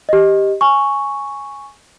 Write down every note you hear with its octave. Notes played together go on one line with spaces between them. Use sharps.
G4 D#5
G#5 C#6